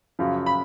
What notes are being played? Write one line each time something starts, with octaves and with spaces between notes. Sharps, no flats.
F#2 C#3 F3
B5